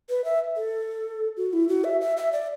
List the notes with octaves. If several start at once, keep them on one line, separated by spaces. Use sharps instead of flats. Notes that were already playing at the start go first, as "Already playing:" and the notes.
B4
E5
A4
F#4
E4
F#4
E5
E5
E5
D5